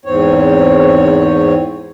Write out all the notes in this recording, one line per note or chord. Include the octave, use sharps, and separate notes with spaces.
E2 G#2 C4 C#5